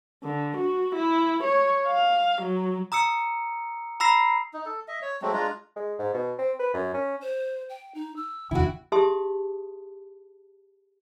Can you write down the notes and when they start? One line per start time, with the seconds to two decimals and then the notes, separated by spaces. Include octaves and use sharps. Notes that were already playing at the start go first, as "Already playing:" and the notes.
0.23 D3
0.57 F#4
0.95 E4
1.43 C#5
1.87 F5
2.41 F#3
2.92 A#5 D#6 E6 C#7
4.00 A#5 B5 E6 A#6 C7
4.54 D#4
4.66 A4
4.88 D#5 E5
5.02 C#5
5.22 F#3 G#3 A3 C4
5.34 G#3 D4 F4 A#5
5.76 G#3
5.99 G#2
6.14 B2
6.38 C4
6.59 B4
6.74 F#2
6.94 C#4
7.22 C5
7.69 G5
7.95 D#4
8.16 E6
8.51 F1 D#2 D4 E4 F#4 G5
8.92 G4 G#4 E5 A5 C6 D#6